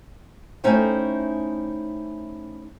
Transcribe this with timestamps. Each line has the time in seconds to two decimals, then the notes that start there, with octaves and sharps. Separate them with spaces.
0.64 A3 C#4 D#4 E4 C5 G5